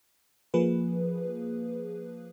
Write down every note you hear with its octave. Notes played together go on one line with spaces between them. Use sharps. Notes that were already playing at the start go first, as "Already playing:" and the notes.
F3 A#3 G#4 B4